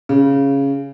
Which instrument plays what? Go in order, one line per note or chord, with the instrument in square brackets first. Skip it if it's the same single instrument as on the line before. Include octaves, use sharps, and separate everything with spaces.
[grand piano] C#3